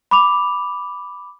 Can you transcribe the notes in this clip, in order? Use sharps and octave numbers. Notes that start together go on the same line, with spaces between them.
B5 D6 F7